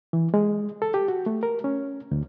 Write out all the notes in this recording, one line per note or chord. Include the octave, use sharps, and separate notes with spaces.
E3
G#3
A4
G4
F#4
A3
A#4
C#4
D2